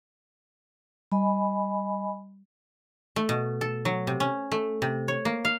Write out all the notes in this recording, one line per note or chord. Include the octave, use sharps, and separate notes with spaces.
G3 D#5 G#5 B5
A3
B2
A4
F#3
C3
C#4
A3
C3
C#5
A#3
F5